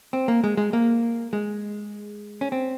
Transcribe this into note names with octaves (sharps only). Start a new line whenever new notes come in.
C4
A#3
G#3
G#3
A#3
G#3
C#4
C4